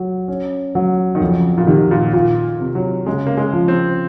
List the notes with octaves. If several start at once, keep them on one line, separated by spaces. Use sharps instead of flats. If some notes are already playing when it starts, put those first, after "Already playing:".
Already playing: F#3
C#4
F#3
D#3
F2 C#3
A#2
C3 D#3
A#2
A#2 F4
C3
F#3
C#3 G#3
A#3
G#3
F3
C4